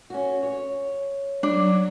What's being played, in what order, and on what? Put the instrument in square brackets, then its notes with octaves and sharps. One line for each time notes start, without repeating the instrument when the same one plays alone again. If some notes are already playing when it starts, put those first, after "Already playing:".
[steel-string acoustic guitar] C#4 F#4
C#5
[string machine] F#3 [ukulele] D4